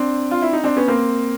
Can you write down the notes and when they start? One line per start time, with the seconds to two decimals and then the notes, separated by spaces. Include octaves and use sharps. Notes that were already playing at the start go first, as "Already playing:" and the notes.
Already playing: C4 D4
0.31 F4
0.42 E4
0.53 D#4
0.64 C4 D4
0.77 B3 C#4
0.88 A#3 C4